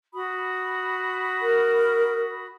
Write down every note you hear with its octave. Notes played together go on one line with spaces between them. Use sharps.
F#4 B5 D#6
A#4